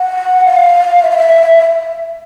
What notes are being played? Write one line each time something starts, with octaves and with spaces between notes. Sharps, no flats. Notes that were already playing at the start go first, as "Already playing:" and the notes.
Already playing: F#5
F5
E5
F5
E5